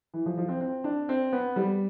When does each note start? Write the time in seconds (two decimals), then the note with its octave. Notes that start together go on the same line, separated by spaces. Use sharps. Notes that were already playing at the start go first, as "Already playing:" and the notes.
0.14 E3
0.26 F3
0.38 F3
0.49 C4
0.61 C4
0.84 D4
1.09 C4
1.33 B3
1.56 G3